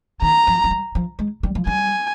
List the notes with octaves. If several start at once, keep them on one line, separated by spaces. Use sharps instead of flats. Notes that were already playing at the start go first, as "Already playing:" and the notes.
D#3 A#5
F3
F3
G3
F3
G#3
G3
F3
G3 G#5